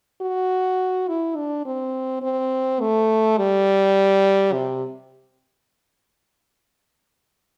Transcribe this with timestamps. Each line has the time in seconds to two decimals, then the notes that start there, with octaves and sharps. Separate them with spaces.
0.21 F#4
1.08 E4
1.37 D4
1.66 C4
2.22 C4
2.81 A3
3.38 G3
4.53 C3